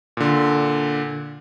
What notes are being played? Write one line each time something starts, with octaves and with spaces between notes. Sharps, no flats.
A#2 D3